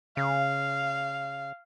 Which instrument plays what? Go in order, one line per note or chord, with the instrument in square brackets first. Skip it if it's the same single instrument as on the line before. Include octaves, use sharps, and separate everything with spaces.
[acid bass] C#3 [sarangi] F5